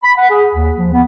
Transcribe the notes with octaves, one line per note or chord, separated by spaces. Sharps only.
B5
F#5
G#4
D#2
F3
B3